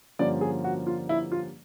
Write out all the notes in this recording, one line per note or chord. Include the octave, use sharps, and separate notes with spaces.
G2 D3 F3 A#3 C#4 D5
G#4
F#4
F4
E4
F4